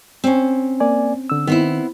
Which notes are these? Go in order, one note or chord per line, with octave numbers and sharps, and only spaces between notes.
C4 C#4
A#3 D5 G#5
D3 E6
D#3 B3 C4 E4